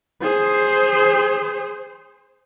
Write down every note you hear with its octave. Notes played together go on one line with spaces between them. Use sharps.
G#4 C5